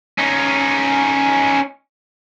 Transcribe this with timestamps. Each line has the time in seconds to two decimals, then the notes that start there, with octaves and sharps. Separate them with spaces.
0.18 C#4 D#4